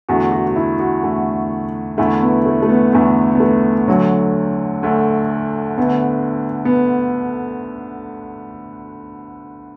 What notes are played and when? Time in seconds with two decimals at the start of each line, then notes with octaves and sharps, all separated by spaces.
0.09 E2 D3 A3 F#4
0.32 F#4
0.47 F#4
0.56 E4
0.80 F#4
1.03 E2 D3 A3
1.98 E2 D3 A3 E4
2.22 B3
2.46 A3
2.62 A3
2.69 B3
2.93 E2 D3 A3 B3
3.35 B3
3.40 A3
3.88 D2 D3 F#3 A3
4.83 D2 D3 A3
5.78 D2 D3 A3 B3
6.65 B3